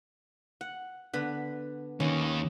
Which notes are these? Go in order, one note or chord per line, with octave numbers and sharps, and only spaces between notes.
F#5
D3 B3 B4
D#2 D#3 C#4